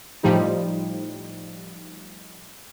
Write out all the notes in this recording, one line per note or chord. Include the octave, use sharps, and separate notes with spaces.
A2 F3 G3 D#4